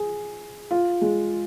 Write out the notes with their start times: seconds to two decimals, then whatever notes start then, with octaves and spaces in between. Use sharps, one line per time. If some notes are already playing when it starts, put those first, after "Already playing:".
Already playing: G#4
0.71 F4
1.02 G#3